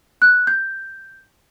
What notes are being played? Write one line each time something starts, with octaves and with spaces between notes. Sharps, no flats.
F#6
G6